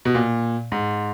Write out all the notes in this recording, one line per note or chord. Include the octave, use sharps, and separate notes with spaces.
B2
A#2
G#2